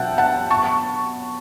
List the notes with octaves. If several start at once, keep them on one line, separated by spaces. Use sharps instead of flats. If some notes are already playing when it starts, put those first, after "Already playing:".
Already playing: B2 F#3 B3 E5 F#5 G5 A5
F#5 A5
A5 C#6